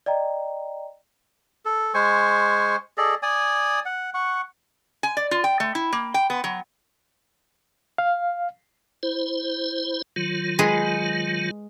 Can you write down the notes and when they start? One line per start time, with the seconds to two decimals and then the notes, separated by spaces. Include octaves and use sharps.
0.06 D5 D#5 G5 A#5
1.65 A4
1.94 G#3 C5 G#5 C#6
2.98 G#4 A4 D5 D#5
3.23 D5 G#5 D#6
3.85 F#5
4.14 F#5 C#6
5.03 G#5
5.17 D5
5.31 F4
5.44 G5
5.60 A3
5.75 E4
5.93 A#3
6.14 G5
6.30 B3
6.44 F#3
7.98 F5
9.03 E4 C5
10.16 D#3 F#3 F4
10.59 G#3 G#4 B4